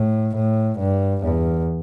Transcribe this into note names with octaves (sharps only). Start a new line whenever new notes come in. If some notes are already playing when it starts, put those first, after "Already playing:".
Already playing: A2
A2
G2
E2